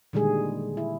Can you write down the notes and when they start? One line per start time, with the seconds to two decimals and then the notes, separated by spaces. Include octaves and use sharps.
0.13 A#2 D3 D#3 G3 G#3 G#4
0.77 E4